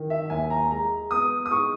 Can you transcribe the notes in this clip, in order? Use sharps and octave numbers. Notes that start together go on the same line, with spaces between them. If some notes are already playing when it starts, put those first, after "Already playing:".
Already playing: D#3
E5
D#2 G#5
A#5
G#3 A#5
B3 D#6
D#6
G#2 C#6